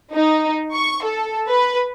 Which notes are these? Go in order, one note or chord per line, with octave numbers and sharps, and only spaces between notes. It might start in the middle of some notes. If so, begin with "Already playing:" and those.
D#4
C#6
A4
B4